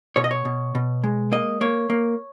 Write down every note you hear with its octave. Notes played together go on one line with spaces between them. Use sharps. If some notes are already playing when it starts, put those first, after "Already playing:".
B2 C#5
D#5
C#5
B2
B2
G#3
A#3 D#5
A#3 C#5
A#3